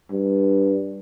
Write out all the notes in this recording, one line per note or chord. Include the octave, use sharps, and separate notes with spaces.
G2